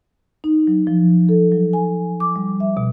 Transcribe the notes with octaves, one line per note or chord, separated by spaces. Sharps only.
D#4
F#3
F3
A4
F#3
G#5
D6
G3
E5
B2